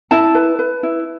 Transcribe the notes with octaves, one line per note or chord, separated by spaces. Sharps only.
E4 A5
B4
B4
E4